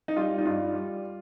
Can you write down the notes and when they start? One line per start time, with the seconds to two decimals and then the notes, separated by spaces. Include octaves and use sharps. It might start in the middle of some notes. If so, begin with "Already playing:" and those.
0.08 D#4
0.17 G3 F4
0.38 D#4
0.45 G2 F4
0.74 G3